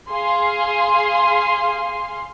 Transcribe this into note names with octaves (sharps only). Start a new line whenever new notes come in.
G#4 F5 C6